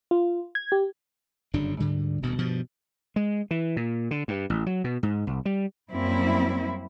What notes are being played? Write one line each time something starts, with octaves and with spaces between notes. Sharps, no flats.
F4
G#6
G4
G1 F#2 C#3 D4
D2 G#2 D3 G3
D#1 D2 B2
G2 B2 F3
G#3
E3
A#2
D3
G2
A1
F#3
B2
G#2
C2
G3
F#2 G3 A#3 C4 E4